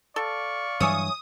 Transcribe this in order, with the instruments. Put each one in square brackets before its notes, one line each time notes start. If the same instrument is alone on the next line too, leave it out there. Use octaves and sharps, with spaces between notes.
[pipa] A4 [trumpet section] D5 F5 C#6
[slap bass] G2 E3 F#3 [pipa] C#5 E5 G#5 [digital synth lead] D#6